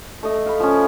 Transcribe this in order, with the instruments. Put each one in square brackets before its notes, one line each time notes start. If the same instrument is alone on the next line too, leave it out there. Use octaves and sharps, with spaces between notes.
[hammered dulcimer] A3 D#5
F5 B5
F3 C#4